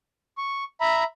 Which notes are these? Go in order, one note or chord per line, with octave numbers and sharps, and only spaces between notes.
C#6
E5 A#5 B5